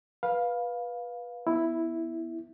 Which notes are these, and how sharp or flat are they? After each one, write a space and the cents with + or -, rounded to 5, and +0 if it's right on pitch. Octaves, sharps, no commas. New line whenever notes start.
B4 -15 F5 +10
B3 +0 E4 +0